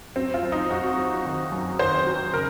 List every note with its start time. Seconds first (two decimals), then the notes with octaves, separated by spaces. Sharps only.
0.16 F#3 C4
0.34 F4
0.43 F#2
0.52 D#4
0.71 F#3 F#4
0.97 F#3
1.25 D#3
1.52 F#2
1.79 D#3 C5
2.07 F#3
2.34 C#3 A#4